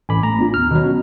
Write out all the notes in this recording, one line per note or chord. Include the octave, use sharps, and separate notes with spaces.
A1 G#5 B5 D6
A3 A#5
B3 D4 F4
D#2 F6
B2 D#3 F#3
C#4